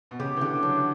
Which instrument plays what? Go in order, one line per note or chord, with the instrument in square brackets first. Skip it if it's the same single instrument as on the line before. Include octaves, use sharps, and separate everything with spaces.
[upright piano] B2
[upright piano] C#3 [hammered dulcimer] G4
[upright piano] E3
[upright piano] D3 [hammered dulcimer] G4
[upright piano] F#3 [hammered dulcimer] D4